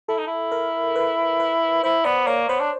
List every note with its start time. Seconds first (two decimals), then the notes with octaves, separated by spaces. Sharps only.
0.08 E4 A4
0.18 D#4
0.27 E4
0.52 A#4
0.96 B4
1.40 B4
1.84 E4 C5
2.05 B3 D5
2.27 A#3 C#5
2.49 B3 C5
2.60 D4